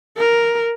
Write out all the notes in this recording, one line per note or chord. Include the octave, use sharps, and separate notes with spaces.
A#4